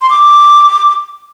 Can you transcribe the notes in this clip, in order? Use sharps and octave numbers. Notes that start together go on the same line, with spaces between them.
C6
D6